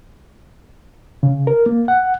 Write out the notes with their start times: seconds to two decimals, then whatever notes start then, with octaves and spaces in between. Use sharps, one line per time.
1.23 C#3
1.47 A#4
1.66 A#3
1.88 F#5